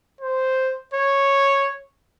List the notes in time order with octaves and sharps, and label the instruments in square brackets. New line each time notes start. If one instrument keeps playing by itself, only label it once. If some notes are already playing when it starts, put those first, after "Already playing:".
[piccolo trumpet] C5
C#5